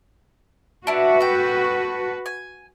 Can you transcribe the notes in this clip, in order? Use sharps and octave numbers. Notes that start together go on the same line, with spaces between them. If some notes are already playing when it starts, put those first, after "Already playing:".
D4 E4 F#4 B4
A4 G5
G#5